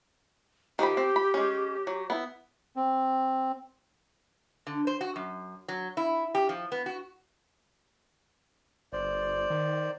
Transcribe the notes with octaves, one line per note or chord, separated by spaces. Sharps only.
D#3 F3 G4 B5
C4
B5
G#3 C#4
F#3
B3 E4
C4
D3
C5
F#4
F#2
F#3
E4
G4
F3
B3
F#4
G1 C5 D5
D#3